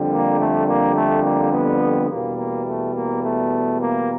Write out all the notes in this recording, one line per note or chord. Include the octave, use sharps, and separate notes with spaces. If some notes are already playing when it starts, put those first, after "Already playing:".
Already playing: F2 D3 G3
A#3
A3
A#3
A3
A#3
B3
E2 B2 G3 A#3
A#3
A3
A#3
A3
A#3